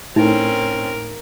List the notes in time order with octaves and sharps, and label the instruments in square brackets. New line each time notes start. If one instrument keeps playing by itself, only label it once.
[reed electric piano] A2 [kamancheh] C4 C#4 [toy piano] D#4 [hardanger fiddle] A#4